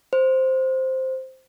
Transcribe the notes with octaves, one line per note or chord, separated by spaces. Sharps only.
C5